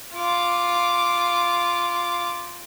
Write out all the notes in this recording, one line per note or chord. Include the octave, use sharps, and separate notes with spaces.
F4 D6